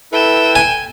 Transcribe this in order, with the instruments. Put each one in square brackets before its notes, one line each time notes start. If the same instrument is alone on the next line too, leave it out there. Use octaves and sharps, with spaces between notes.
[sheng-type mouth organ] E4 A4 B4 [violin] G5 E7
[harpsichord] G#5